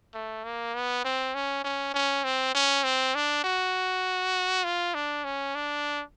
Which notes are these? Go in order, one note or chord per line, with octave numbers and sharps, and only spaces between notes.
A3
A#3
B3
C4
C#4
C#4
C#4
C4
C#4
C4
D4
F#4
F4
D4
C#4
D4